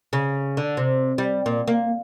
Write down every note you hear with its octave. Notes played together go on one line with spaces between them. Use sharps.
C#3
D3
C3
G3
A#2
A#3